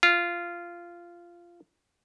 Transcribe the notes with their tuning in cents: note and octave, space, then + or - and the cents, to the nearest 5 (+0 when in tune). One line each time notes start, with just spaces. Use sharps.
F4 -15